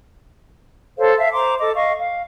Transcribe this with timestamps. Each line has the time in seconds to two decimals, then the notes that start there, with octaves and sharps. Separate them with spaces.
0.98 A4 C5 C#5 F5
1.18 E5 F5
1.33 C5 A#5 C6 D6
1.60 A4 D#5 D6
1.76 D#5 F5 C#6
1.99 F5